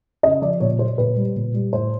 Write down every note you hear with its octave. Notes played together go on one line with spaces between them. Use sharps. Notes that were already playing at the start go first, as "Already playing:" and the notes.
C#3 D#5
F3 D5
A#2 C#5
F#3 C5
A#2 B4
G3
A#2
G3
A2 C5